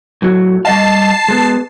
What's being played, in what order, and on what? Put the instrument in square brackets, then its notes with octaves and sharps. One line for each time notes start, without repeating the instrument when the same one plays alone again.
[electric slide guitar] A2 F#3 F#4
[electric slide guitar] G3 D#5 F5 [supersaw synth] A5 C7
[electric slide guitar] G#3 B3